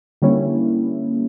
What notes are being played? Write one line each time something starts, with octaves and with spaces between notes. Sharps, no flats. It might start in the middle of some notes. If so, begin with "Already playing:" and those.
D3 G3 A#3 C#4 E4